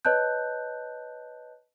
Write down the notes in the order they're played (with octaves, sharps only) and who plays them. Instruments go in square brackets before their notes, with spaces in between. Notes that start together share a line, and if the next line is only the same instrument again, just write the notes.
[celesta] B4 C#5 D#5 A5 F#6 G6